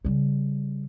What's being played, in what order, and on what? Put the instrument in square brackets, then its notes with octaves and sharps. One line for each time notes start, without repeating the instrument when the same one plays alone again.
[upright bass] C#3 G3